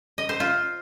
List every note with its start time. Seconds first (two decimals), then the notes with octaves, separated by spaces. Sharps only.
0.18 D#5
0.29 C5
0.40 F4